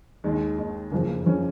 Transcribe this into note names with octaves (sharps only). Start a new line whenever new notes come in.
D#2 D#3 G#3
D#2 D#3
F#1 F2 C#3 F3 A#3
A#3
C#3 F3 C#4